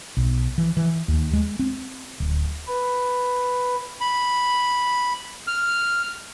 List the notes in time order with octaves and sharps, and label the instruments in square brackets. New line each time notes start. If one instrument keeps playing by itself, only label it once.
[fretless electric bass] B1
E3
E3
D#2
G#3
C4
D1
[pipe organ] B4
[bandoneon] B5
F6